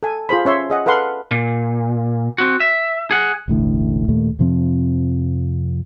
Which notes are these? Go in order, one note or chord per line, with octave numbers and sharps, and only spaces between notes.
A4 G#5
F4 G#4 C5 B5
C#4 C#5 E5 C6
G#4 D#5 F#5
A4 B4 F5 F#5 C6
A#2
C4 F#4
E5
G#4 F#5
E1 A1 A2 D3
D#2 A#2 A3
F2 C3 F3 C4